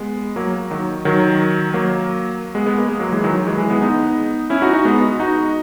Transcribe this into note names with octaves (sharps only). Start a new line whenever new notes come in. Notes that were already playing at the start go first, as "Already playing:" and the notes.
Already playing: G#3 B3
F#3 A#3
D#3 F#3
D#3 F#3
F#3 A#3
G#3 B3
G#3 B3
A#3
G#3
F#3 A#3
E3 G#3
D#3 F#3
E3 G#3
E3 G#3
G#3 B3
B3 D#4
C#4 E4
D#4 F#4
D#4 F#4
G#3 B3
D#4 F#4